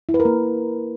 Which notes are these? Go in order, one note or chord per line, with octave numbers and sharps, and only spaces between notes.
E4
B4
A#4
A#3